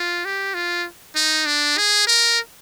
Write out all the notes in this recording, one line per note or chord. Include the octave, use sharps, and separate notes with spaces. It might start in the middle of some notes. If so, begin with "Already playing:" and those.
Already playing: F4
G4
F4
D#4
D4
G#4
A#4